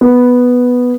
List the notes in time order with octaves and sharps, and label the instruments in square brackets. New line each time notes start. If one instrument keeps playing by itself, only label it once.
[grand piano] B3